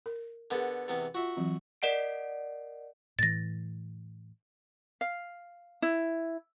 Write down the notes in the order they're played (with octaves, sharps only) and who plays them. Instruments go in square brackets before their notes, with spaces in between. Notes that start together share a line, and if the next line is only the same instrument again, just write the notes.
[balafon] A#4
[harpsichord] D3 B3 [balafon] G#4 A#4 F#5
[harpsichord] E2 C3 B3
[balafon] F4 [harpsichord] F#4 E5
[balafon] E3 F#3 C4
[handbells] A#4 D5 D#5 F#5 C7 D7
[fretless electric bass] A2 E3 [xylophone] A6 A#6
[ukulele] F5
E4